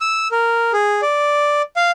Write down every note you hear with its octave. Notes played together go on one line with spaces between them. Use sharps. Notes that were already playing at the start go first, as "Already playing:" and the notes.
E6
A#4
G#4
D5
F5